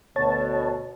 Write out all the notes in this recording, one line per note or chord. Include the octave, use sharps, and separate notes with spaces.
D2 B2 C#5 A5